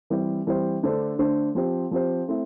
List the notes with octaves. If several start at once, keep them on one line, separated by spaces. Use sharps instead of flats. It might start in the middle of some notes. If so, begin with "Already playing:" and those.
E3 G3 C4 G4 C5
E3 G3 C4 G4 C5
D3 A3 D4 A4 C5
D3 A3 D4 A4 C5
F3 C4 G4 C5
F3 C4 G4 C5
A3 C4 E4